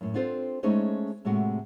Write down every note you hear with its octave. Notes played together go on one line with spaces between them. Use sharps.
F#2 A2
C4 D4 F4 A4 C5
G#3 A3 C#4 D#4 G#4 C5
A2 C3 G#3 A3 F#4